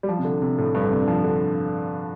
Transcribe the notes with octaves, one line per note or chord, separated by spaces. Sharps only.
G3
F3
C3
D3
C3
A2
G2
D3
C3
F3
D3